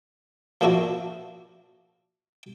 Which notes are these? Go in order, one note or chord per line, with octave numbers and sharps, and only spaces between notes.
F3 A#3 D4 E4 F#4